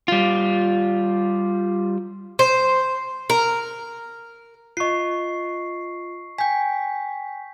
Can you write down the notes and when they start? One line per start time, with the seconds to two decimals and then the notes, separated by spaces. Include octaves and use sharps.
0.08 G3 F4
2.39 C5
3.30 A#4
4.77 F4 D#5 C#6 C7
6.38 G5 G#5 G6 B6